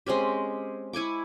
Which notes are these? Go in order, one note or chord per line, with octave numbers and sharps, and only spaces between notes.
G#3 C4 C#4 G4
E4 G#5 C#6 D6